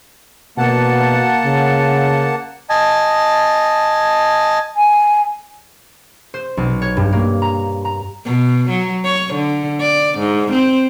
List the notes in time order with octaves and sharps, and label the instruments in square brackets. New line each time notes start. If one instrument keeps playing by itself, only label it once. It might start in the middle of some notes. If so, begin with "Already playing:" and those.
[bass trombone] B2 [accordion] A#3 F#5 A5
[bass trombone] C#3
[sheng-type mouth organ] D#5 G#5 A5
[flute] G#5
[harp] C5
B1
C#5
G2
A#3
A#5
A#5
[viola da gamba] B2
F#3
C#5
D3
D5
G#2
C4